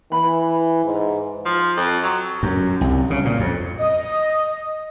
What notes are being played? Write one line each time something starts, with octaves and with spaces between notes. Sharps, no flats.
E3 B5
G#2
F3
F2
F#3
F#2
C2
C#3
A#2
F2
D#5 D#6